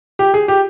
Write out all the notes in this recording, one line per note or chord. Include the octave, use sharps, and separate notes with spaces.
G4
G#4
G4